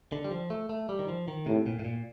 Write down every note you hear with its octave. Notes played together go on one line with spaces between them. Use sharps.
D3
G3
F3
A3
A3
G3
D#3
F3
D#3
A2 C3
A#2
A2
A#2